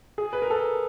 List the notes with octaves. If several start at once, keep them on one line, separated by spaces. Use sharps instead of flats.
G#4
B4
A#4
A4